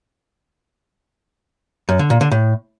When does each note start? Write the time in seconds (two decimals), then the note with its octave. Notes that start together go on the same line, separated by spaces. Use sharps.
1.89 F#2
1.99 D3
2.10 A#2
2.21 D3
2.31 A2